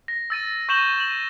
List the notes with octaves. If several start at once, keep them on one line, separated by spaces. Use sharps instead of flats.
A#6
E6 A6 D#7
C#6 G6 A#6 E7 F#7 G7
E7 F#7